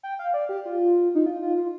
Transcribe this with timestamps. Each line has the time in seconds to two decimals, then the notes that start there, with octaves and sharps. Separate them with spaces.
0.03 G5
0.19 F5
0.34 D5
0.49 G4
0.65 F4
1.15 D#4
1.26 F4
1.42 F4
1.57 F4